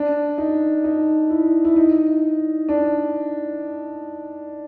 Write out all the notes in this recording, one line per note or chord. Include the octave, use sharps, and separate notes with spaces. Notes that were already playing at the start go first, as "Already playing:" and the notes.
Already playing: D4
D#4
D#4
E4
E4
D#4
D4